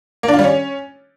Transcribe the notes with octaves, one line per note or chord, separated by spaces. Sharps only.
A#3
D4
F4
G3
C#4